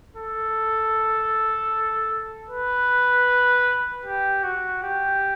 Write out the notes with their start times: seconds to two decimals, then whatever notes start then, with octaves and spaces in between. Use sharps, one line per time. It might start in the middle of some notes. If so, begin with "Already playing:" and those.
0.16 A4
2.50 B4
4.05 G4
4.44 F#4
4.83 G4